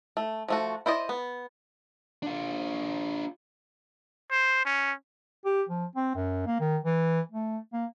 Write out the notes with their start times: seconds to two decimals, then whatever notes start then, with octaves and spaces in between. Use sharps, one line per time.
0.17 A3
0.48 F3 A3 F#4
0.86 E4 C5 D5 D#5
1.09 B3
2.22 D4 F4
4.31 C5
4.65 C#4
5.45 G4
5.69 F3
5.95 C4
6.15 F#2
6.46 A#3
6.60 D#3
6.85 E3
7.31 A3
7.73 A#3